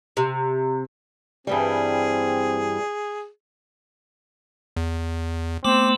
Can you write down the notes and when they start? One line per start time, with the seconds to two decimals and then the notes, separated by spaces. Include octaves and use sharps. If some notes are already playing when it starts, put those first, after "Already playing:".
0.17 C3
1.47 G2 E3 G3 C4 G#4
4.77 E2
5.65 A3 B3 C4 D6